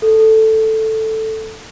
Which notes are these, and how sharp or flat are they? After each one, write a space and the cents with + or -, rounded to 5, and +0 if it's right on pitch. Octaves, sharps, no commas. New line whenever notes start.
A4 +0